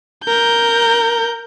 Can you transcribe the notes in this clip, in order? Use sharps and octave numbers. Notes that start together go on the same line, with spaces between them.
A#4 G6